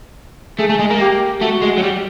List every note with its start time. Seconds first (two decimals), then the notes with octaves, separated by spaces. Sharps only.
0.59 A3 G#4
0.69 A3
0.79 G#3
0.90 A#3
1.00 G4
1.41 A3 F#4
1.62 G#3
1.78 F#3
1.83 G3